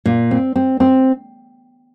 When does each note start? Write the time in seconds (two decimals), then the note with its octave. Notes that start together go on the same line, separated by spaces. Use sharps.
0.06 A#2
0.31 C4
0.56 C4
0.80 C4